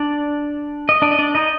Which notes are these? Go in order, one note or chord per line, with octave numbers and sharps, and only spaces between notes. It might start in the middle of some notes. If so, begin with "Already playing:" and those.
Already playing: D4 D5
D#5
D4 D5
D#5
D4 D5
D#4 D#5